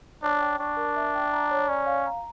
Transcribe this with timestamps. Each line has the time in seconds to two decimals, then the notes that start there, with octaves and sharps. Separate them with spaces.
0.22 D4 C#5
0.41 G5
0.59 D4 C#6
0.77 A#4
0.96 E5
1.14 G5
1.33 A#5
1.51 C#5
1.69 C#4 D5
1.86 F5
2.06 A#5